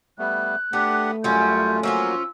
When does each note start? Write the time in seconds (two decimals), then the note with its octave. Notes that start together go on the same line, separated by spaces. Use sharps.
0.19 G3 A3 B3 F#6
0.73 A3 B3 D4 G4 F#5
1.24 F#2 F#3 G3 C#4 F4 G6
1.83 F3 F#3 A#3 C#4 F4 F#4 E6